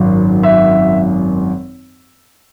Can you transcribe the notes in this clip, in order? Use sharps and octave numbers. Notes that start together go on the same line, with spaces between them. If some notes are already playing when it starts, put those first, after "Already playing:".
Already playing: G#1 F#2 D#3 F#3
E5